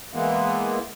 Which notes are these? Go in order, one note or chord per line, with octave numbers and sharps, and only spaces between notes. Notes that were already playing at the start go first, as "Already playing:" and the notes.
E3 G#3 A#3 B3